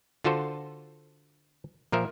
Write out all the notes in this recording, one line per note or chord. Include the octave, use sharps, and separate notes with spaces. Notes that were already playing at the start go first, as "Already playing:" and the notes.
D3 F4 F#4 A4 C5
A#2 F3 A#4 E5